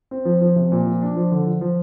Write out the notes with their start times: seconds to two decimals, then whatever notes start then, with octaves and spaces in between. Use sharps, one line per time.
0.11 C4
0.25 F3
0.41 F3
0.56 C3
0.72 A#2
0.86 F3
1.02 D4
1.16 F3
1.32 D3
1.47 F3
1.61 F3